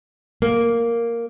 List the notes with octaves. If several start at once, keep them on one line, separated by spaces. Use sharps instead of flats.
A#3